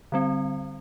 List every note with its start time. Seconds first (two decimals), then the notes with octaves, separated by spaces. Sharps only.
0.12 D3 G3 C4